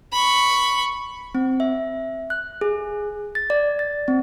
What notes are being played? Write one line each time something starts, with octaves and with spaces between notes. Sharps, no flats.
B5 C#6
C4
E5
F#6
G#4
A6
D5
A6
C4